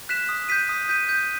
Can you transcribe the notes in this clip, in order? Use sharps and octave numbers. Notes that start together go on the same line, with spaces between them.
F#6 B6 E7
D#6
G6 B6 D#7
D#6
G6 B6 D#7
G6